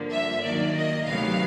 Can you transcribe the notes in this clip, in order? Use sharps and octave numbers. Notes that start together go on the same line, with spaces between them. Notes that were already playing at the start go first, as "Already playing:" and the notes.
Already playing: G2 D3 F3 A#3
E5
D#2 D#3 F#3 A#3 D5
D#5
D2 C3 D#3 F#3 B3 F5